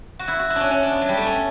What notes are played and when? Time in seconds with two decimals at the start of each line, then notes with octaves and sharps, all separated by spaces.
0.19 F#4
0.28 E4
0.39 F#4
0.50 E4
0.56 C#4 D4
0.71 C#4
0.83 D4
0.92 B3
1.02 F#3
1.09 G3
1.17 A3
1.26 C#4